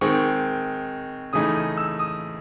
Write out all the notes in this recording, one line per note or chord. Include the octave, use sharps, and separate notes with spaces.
D#3 G#3 C4 C#6
C#3 E3 A3 D#4 D#6
D#6
E6
D#6